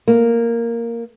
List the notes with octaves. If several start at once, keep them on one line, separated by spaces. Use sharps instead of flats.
A#3